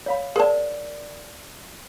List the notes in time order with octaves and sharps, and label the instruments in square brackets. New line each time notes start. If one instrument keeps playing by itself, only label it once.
[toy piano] C#5 F5 B5
[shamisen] G#4 A5 [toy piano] A#4 C5 D5